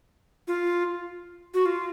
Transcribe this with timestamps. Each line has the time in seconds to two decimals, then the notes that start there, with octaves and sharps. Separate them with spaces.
0.48 F4
1.54 F#4
1.66 F4